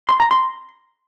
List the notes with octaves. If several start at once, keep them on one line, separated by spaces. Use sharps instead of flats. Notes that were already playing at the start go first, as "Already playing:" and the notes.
C6
A#5
C6